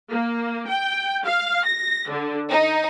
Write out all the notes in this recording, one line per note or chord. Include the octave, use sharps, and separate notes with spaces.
A#3
G5
F5
A#6
D3
D#4